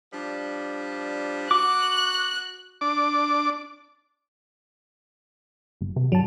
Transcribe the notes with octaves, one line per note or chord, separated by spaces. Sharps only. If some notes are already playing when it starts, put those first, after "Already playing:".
F3 G3 D4
F#4 D6 F#6
D4 D6
G1
C3
G2 F#3 A5